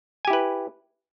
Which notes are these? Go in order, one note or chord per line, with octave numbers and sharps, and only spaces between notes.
E4 G4 B4 G#5